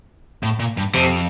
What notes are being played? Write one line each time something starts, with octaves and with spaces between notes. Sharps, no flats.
A2
A#2
G2
F2 C3